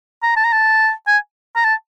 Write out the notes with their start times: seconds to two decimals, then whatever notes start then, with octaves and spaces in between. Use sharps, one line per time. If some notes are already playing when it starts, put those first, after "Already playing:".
0.23 A#5
0.37 A5
0.45 A#5
0.52 A5
1.07 G#5
1.56 A#5
1.64 A5